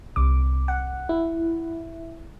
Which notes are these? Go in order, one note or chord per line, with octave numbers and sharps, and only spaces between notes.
C2 C3 D6
F#5
E4